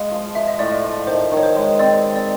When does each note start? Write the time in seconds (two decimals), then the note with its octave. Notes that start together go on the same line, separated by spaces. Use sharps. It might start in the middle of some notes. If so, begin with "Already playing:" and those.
Already playing: G#3 F5
0.11 F3
0.35 F3 E5
0.48 D#5
0.59 A2 D5
0.72 D#5
0.84 F3
1.07 D#3 C5
1.32 D#3
1.37 C#5
1.43 C5
1.56 G#3
1.79 C4 D5
2.04 C4
2.16 D5